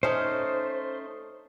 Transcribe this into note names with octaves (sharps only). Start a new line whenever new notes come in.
A3 C#4 D#4 C5